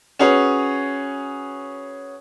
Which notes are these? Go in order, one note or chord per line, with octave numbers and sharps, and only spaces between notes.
C#4 F#4 G#4 B4 C#5